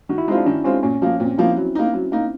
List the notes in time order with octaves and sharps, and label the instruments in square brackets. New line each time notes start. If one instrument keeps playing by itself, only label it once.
[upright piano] D#3 [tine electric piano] F#4
[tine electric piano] E4
[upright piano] G#3 C4 F4 [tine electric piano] D#4
[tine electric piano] D4
[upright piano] D#3 [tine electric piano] C#4
[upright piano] G#3 C4 F4 [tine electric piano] C#4
[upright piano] A#2 [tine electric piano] C#4
[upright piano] F3 A#3
[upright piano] A#2 [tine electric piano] C4
[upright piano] F3 A#3 [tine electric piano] E4
[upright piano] F#3
A#3 D#4
F#3
A#3 D#4